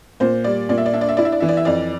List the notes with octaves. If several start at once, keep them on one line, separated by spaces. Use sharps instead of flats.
A#2 C5
G3 D5
A#2 D5
E5
D5
D4 E5
D5
E5
E4 D5
E5
D5
E3 E5
D5
E5
F2 D5